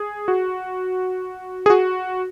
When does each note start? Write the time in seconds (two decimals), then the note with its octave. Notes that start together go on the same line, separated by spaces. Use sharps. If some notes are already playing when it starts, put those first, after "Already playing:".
Already playing: G#4
0.28 F#4
1.66 G#4
1.70 F#4